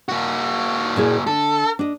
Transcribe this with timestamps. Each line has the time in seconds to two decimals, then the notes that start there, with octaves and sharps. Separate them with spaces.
0.09 A#3 F#4
0.96 A#2 E4 G#4
1.27 D3 A4
1.79 D4 D#5